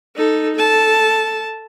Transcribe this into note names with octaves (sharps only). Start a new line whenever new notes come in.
D#4 A4
A4 A5